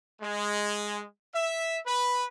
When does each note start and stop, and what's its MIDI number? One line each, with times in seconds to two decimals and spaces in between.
0.21 1.03 56
1.34 1.79 76
1.86 2.26 71